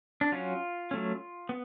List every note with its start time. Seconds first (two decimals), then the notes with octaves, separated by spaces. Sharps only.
0.21 D4
0.32 F#3 C#4 F4
0.91 F#3 A3 C#4
1.49 B3